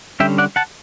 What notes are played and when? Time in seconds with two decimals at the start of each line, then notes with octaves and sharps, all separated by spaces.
0.20 D3 G3 C#4 E5 G5
0.38 D5 F#5
0.56 F#5 A5